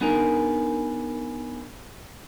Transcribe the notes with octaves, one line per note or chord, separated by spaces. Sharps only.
B3 D4 D#4 G#4 A#4 B4